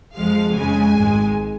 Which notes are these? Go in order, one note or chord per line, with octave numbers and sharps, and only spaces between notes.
F2 F3 G#3 F5
F2 C#3 G#3 G#5
G#1 G#2 G#3